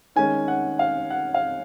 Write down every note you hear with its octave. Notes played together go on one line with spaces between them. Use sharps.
D#3 G#3 C#4 G#5
F#5
F5
F#5
F5